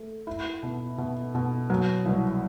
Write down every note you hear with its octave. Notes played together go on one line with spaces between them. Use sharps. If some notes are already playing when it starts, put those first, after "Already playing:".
Already playing: A3
E4
B2
B2
B2
F#3
C2